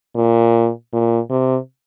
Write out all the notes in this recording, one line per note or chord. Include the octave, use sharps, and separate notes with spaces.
A#2
A#2
C3